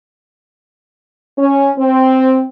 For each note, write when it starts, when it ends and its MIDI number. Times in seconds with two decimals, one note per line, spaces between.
1.37 1.70 61
1.78 2.43 60